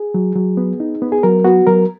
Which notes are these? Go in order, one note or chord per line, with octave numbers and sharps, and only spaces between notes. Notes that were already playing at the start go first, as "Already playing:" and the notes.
Already playing: G#4
F#3
F#3
B3
D#4
B3
G#4
F#3 A#4
B3 F#4
F#3 A#4